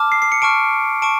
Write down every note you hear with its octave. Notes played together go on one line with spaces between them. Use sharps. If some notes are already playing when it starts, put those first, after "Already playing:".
Already playing: A5 D6 F6
C7
C7
C#7
A5 C#6 F6 D7
A5 C#6 D7